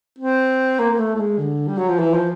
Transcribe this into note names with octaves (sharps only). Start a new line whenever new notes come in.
C4
A#3
A#3
A3
A3
G#3
D3
G3
F#3
F3
E3
F3